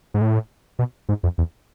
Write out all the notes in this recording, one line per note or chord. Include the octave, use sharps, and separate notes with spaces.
G#2
A2
B2
G#2
F2
E2